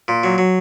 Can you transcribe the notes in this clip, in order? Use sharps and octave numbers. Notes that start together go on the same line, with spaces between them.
A#2
F#3
F#3